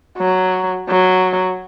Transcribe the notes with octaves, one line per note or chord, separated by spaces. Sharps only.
F#3
F#3